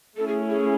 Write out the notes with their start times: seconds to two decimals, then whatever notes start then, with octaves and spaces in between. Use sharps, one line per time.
0.17 A3 C#4 E4 A4
0.28 G#4
0.49 G#4